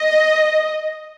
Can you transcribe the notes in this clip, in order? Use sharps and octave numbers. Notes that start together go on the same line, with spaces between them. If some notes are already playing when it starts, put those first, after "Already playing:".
Already playing: D#5